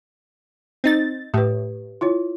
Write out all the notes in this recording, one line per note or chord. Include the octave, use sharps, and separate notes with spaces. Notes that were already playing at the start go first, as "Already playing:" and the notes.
C4 D#4 A6
A2 G4 B4
E4 F4 C#5